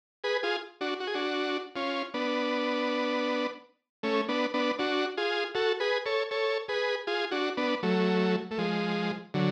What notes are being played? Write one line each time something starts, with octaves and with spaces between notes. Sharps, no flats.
G#4 B4
F4 G#4
D4 F#4
F#4
G#4
D4 F#4
C#4 F4
B3 D4
A3 C#4
B3 D4
B3 D4
D4 F#4
F4 G#4
F#4 A4
G#4 B4
A4 C#5
A4 C#5
G#4 B4
F4 G#4
D4 F#4
B3 D4
F#3 A3
A3
F3 G#3
D3 F#3